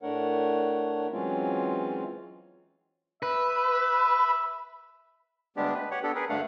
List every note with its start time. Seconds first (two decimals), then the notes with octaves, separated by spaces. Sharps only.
0.02 A2 A3 D4 A#4 C#5 F#5
1.12 E3 F#3 G#3 C4 C#4 F4
3.23 B4 E5
5.57 D2 G3 G#3 B3 D4 G4
5.74 B4
5.91 G4 C#5 F#5
6.03 B3 D4 G4 A4
6.15 G#4 A#4 B4
6.29 D2 G2 A3 D4 F5 F#5